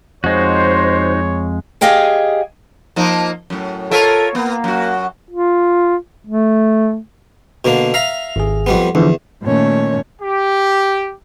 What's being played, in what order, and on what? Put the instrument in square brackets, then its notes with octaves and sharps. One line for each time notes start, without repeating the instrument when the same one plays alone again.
[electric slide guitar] F2 G#3 [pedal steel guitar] D#4 F#4 [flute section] C5 [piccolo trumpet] C#5
[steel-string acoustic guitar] G4 G#4 D#5 F5 G5 G#5
[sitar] F3 A#3 D#4
F#2 A2
[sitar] F4 A#4 E5 [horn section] A4 C#5
[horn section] A#3 [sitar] B3
[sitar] F#2 F#4
[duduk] F4
A3
[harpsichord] B2 D3 A#3
E5 F5 A#5
[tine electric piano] G#1 G#4
[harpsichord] F2 G3 B3
[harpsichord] E2 [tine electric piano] D3 E3 F3
[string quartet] A#2 D#3 A3 C#4 C#5
[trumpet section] G4